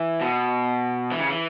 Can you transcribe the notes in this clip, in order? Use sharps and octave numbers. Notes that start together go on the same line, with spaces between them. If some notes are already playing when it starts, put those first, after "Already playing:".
Already playing: E3
B2
E3
C#3
E3